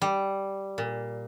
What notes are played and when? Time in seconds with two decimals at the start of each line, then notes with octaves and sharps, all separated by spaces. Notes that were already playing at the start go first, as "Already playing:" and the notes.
0.02 G3
0.78 A#2